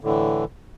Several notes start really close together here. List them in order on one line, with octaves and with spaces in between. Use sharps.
A2 D3 E3